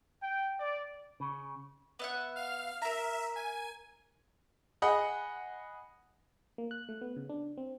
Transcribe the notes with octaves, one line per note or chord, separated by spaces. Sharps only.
G5
D5
C#3
B3 E5 F#5
F5 F6
A#4 E5 A#5
G#5
G#4 D#5 F#5 B5
A#3
F#6
A3
B3
C#3
D4
C4